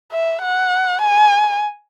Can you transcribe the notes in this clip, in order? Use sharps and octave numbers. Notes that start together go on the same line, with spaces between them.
E5
F#5
G#5